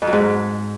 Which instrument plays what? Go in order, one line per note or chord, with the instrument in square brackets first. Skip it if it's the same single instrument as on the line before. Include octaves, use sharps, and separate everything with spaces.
[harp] F2
F#3
G#2